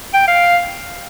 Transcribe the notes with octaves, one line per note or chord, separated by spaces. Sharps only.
G5
F5